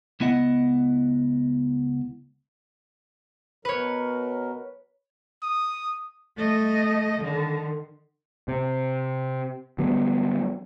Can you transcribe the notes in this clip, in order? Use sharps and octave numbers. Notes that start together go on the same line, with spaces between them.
C#2 B3 E4 D#5 F#5
B2 F#3 A#4 B4 C#5
D#6
A3 D#5
D3 D#3
C3
D3 F#3 G3 B3